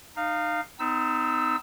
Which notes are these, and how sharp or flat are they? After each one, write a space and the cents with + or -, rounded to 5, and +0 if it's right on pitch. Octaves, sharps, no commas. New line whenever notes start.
D#4 -25 F5 +0
B3 +45 D#4 +0 E6 +0